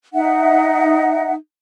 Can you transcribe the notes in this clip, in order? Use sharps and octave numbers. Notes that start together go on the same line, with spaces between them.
D#4 E5 F#5